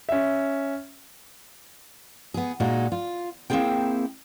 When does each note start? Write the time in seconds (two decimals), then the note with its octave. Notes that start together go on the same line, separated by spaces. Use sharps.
0.09 C#4 E5
2.34 B3 G#4
2.60 A#2 G#3 D#4 F#4
2.92 F4
3.50 A#3 C4 E4 F4 G#4 G5